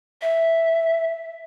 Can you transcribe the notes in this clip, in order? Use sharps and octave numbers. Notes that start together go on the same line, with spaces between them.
E5